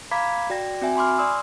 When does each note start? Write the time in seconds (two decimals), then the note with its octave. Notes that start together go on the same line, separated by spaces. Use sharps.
0.12 F5 A#5 B5 D6 G#6 B6
0.50 F#4 D5 G5 A#6
0.82 C4 F#4 E5 G#5
0.96 G#5 B5 C6 D6 F6
1.18 D5 C6 D#6 E6